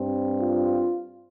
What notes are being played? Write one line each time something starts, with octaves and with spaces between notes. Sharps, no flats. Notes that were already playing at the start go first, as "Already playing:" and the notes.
Already playing: G2 G3 C4
F4